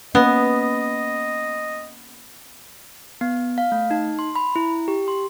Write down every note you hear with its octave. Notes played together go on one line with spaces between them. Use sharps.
A#3 B3 C#4 D#5
B3
F5
A3
D#4
C6
B5
E4
G4
C6